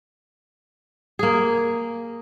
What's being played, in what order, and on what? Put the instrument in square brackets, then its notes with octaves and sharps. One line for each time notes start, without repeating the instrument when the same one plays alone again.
[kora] A#3 G#4